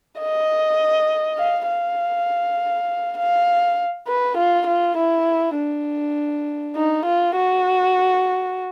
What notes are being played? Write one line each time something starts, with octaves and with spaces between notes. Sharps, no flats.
D#5
F5
F5
F5
B4
F4
F4
E4
D4
D#4
F4
F#4